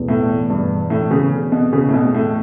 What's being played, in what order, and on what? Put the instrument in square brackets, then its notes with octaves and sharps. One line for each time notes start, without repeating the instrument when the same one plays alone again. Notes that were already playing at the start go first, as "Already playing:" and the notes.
Already playing: [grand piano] E2 B2 A3
[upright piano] A2
G2
A2
C#3
B2
C#3
A2
B2
A2